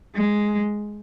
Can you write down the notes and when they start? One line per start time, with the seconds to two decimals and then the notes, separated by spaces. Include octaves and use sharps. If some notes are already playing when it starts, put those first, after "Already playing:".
0.15 G#3